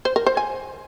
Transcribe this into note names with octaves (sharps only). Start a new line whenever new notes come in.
C5
A#4
C5
G#5